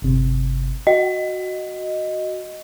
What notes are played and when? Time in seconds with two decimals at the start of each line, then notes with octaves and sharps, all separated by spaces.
0.02 G1 C3
0.87 F#4 D#5